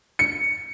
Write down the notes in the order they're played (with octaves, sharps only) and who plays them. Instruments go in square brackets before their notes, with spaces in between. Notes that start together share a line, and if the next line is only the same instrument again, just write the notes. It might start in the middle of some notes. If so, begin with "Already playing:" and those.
[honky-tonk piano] C#7